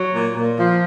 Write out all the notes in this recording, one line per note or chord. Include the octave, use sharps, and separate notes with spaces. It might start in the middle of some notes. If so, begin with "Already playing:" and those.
Already playing: F#3
A#2
A#2
F3